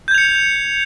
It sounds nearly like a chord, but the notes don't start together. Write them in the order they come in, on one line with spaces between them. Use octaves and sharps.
G6 G#6 F7 C#7